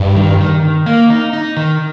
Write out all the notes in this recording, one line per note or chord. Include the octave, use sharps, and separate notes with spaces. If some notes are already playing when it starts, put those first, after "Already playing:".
Already playing: G2
D#3
D#3
D#3
A#3
D#4
D#4
D#3